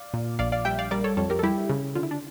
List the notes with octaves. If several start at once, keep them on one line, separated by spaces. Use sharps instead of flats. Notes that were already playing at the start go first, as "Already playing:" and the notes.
Already playing: D5 F5
A#2
A#1 D5 F5
D5 F5
G3 E5 G5
D5 F5
G3 A#4 D5
A4 C#5
F2 A4 C#5
G4 A#4
A4
G3 E4 G4
C#3
D3 F4
E4
D4